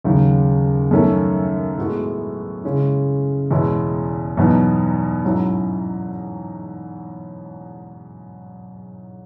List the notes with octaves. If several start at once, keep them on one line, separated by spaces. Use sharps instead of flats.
D#2 C#3 F#3
F#2 D#3 A3 C#4
A2 G#3 B3 F#4
C#3 G#3 C#4 E4
E2 B2 G#3 C#4 E4
E2 B2 F#3 B3 D#4
G#2 F#3 C#4 E4